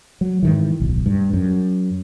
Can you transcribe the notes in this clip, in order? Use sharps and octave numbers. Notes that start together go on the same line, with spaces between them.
F#3
G#2 D#3 E3
D1 B1
G2
F#2